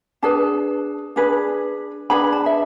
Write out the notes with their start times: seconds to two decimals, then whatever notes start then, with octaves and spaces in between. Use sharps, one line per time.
0.22 D4 G#4 B4 A5
1.16 D4 G#4 B4
2.10 D4 G#4 B4 B5
2.32 A5
2.46 E5